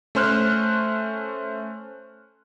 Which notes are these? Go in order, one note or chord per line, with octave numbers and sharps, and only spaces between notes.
A3 C#4 C5 F6 F#6